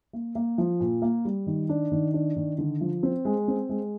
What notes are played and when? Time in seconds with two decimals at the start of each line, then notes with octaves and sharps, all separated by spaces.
0.13 A#3
0.35 A#3
0.58 F3
0.80 A#2
1.02 A#3
1.25 G3
1.47 D#3
1.69 D4
1.92 D#3
2.14 D4
2.36 D#3
2.58 D3
2.81 F3
3.03 C4
3.25 G#3
3.48 C4
3.69 G#3